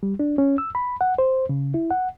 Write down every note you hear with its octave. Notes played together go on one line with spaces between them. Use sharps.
G3
D4
C#4
E6
B5
F#5
C5
C#3
E4
F#5